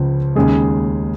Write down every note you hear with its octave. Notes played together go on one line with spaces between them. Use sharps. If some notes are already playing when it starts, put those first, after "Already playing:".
Already playing: C#2 C#3 F3
D#2 C#3 G#3 G#4